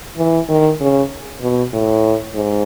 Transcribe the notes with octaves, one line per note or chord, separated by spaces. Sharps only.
E3
D#3
C#3
B2
A2
G#2